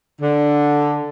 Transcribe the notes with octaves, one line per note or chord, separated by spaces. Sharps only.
D3